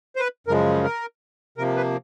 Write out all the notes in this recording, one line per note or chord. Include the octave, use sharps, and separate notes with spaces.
C5
B4
F#2 C#3 F3 G#3 A#4
A#4
C3 F3 A#3 A#4
B4